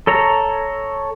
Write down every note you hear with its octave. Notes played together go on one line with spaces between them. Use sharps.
A4 C#5 A#5